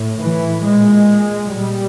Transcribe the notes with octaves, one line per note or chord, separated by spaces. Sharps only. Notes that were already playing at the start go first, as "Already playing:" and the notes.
Already playing: A2
E3
A#2 G#3
A#2 G3